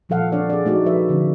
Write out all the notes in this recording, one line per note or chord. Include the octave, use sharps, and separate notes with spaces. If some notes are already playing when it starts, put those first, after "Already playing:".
A#2 F3 G3 A4 F5 F#5
C4 D4 A4 C#5 D5
G#4 D5
A3 D#4 F#4 D5
F3 D#4 B4 E5
D3 F3 C#4 D4